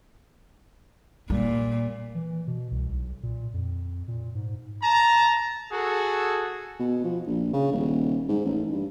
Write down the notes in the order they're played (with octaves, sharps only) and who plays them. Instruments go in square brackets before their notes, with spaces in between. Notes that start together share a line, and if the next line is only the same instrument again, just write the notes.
[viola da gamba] A#2 [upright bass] G3
[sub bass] E3
B2
C2
B1
A#2
F2
A#2
G#2
[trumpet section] A5 A#5
F#4 G#4 A4
[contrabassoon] B2
F3
A#1
C#3
D#1
G#2
A1
G2